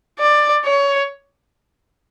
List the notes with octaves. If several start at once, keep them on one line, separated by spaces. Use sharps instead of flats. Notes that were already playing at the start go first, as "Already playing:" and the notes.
D5
C#5